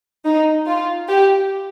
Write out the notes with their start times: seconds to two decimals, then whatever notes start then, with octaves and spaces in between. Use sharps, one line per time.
0.25 D#4
0.68 F4
1.09 G4